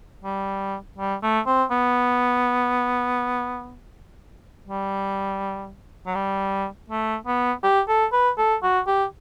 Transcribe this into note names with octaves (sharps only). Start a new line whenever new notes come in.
G3
G3
A3
C4
B3
G3
F#3
G3
A3
B3
G4
A4
B4
A4
F#4
G4